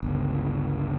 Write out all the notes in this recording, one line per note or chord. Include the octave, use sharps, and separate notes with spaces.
G1 C#2